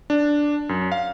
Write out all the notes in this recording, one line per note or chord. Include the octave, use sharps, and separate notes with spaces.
D4
F#2
F5